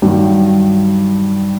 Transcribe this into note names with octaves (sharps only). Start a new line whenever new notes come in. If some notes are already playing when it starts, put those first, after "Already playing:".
G2 D#3 F#3